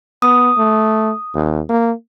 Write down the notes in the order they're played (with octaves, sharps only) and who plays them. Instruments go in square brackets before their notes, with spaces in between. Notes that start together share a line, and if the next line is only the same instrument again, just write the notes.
[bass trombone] B3 [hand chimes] D#6
[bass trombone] A3
D#2
A#3